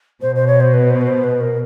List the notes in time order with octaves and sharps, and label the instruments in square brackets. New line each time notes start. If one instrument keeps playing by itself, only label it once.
[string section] B2 [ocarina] C5
[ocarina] C5
C#5
C5
B4
C5
B4
C5
B4
A#4